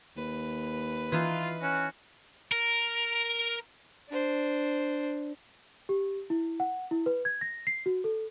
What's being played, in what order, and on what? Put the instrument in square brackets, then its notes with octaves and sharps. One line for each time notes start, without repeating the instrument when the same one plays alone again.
[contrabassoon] D#2 [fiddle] B4
[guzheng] E3 D#4 [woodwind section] F4
[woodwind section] C#4 F#4
[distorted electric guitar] A#4
[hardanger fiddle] D4 C5
[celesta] G4
E4
F#5
E4
B4
G#6
A#6
C7
F#4
A4